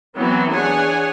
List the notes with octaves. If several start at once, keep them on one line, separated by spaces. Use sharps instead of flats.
E3 F#3 B3 C4
E3 D4 G#4 C#5 F#5 G#5